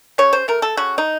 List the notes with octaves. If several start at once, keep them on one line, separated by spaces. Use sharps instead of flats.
C#3 C#5
C5
A3 A#4
A4
C#3 F#4
D#4